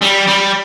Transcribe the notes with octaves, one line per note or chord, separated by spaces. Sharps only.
G3
G3